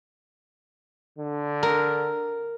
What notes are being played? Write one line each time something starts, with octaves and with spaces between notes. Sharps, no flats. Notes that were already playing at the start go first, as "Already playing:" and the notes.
D3
A#4